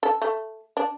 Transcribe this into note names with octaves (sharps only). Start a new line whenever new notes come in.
A4
A3
D4